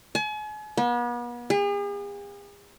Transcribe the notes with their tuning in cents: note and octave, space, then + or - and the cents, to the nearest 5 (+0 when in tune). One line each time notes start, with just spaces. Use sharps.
G#5 +40
B3 -40
G#4 -45